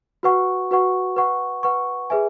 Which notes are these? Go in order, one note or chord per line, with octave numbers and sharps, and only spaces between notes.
F#4 B4 F#5 C#6
F#4 B4 F#5 C#6
B4 F#5 C#6
B4 F#5 C#6
G#4 B4 E5 G#5